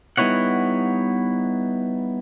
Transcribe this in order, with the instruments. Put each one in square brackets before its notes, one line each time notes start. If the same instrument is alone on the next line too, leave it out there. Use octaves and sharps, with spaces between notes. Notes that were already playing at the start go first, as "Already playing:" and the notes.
[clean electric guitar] G3 B3 D#4 E4 C#5 F#5